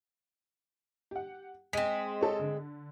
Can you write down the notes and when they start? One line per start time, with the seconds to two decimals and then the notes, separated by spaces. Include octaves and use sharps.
1.11 G4 F#5
1.73 G#3 C4 B6
2.21 G#4 A4 C#5
2.39 D3